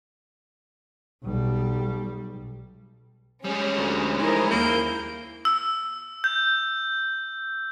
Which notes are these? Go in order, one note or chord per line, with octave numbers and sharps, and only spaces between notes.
B1 G3
G3 G#3 C#4 C#5
D2
C#4 D#4 E4 A#4 C5
D#2 A#3 G6
E6
G6